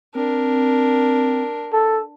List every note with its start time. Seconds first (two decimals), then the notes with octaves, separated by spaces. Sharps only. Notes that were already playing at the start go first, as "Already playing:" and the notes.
0.15 C4 D4 A#4
1.73 A4